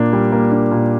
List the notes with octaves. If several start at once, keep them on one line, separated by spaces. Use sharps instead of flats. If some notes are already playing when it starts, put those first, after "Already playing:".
Already playing: A#2 A#3 D4
G3
A#3
D4
A#2